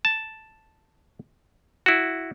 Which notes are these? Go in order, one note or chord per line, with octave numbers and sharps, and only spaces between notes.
A5
E4 F#4